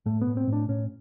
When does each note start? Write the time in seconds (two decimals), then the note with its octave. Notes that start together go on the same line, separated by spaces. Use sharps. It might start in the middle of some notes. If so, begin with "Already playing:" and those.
0.06 A2 A3
0.21 B3
0.27 A2
0.37 C4
0.47 A2
0.53 D4
0.68 A2 C#4